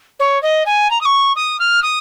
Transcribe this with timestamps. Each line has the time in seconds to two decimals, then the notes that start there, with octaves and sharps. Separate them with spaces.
0.19 C#5
0.42 D#5
0.66 G#5
0.90 A#5
1.01 D#6
1.05 C#6
1.36 D#6
1.59 F6
1.82 D#6